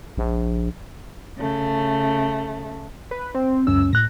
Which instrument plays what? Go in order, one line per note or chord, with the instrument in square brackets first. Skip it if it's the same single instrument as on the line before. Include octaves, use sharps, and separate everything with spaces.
[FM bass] A#1
[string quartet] C#3 A3
[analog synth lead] B4
C4
[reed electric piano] C#2 F#2 C#4 [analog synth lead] E6
[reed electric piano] A2 F#6 [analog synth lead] A#6